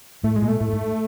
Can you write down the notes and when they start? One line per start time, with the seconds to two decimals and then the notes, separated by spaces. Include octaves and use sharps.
0.24 A2 A3
0.36 G#3
0.42 A#2
0.48 A3
0.60 A2 A3
0.73 G#2